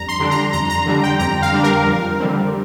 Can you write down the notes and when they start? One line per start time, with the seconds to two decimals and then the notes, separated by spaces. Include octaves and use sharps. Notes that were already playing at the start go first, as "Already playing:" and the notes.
Already playing: F2 G3 D4 A#5
0.08 C6
0.20 D3 G3 D4
0.31 A#5
0.53 F2 A#5
0.70 A#5
0.86 D3 G3 D4
1.03 G5
1.19 F2 A#5
1.42 F5
1.52 D3 G3 D4
1.64 A#4
1.86 F2
2.20 D3 G3 C4